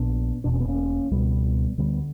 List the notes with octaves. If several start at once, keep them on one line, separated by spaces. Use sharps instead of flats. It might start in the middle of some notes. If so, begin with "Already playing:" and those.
Already playing: A#1 A#2 B3 D4
E1 E2 B2 D4
C#4
B3
A#3 C#4
C#2 B2 G3 B3
D2 D3 G3 B3